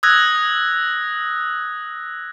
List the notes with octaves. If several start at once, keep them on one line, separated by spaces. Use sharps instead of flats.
D#6 E6 F#6 G#6 A#6